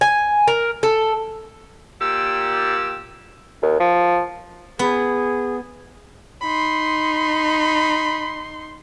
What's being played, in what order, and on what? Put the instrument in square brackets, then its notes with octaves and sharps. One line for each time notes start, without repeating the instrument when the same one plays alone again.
[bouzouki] G#5
A#4
A4
[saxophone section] A#2 G4 [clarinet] E6
[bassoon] D#2
F3
[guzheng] B3 [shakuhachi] G#4
[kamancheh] D#4 C6 [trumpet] B5